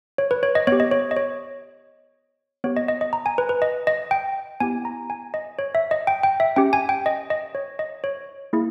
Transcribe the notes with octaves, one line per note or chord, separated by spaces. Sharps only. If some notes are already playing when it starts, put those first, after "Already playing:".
C#5
B4
C#5
D#5
B3 G4 C#5
D#5
C#5
D#5
C#5
B3 G4 C#5
D#5
D#5
D#5
A#5
G#5
B4
B4
D#5
D#5
G5
B3 E4 G4 G#5
A#5
G#5
D#5
C#5
E5
D#5
G5
G5
E5
C#4 G4 G5
G#5
G5
D#5
D#5
C#5
D#5
C#5
A#3 E4 G#4